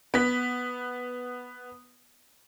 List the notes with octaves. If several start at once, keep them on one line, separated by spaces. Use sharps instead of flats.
B3 B6